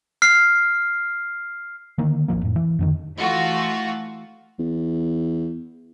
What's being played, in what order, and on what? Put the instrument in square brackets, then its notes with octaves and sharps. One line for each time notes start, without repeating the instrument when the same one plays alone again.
[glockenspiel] F6 C7
[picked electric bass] D3 D#3 A#3
D1 A1 F3 A#3
F2 A2
E3
F2 D3 D#3
[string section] E3 A3 F4 F#4
[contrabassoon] E2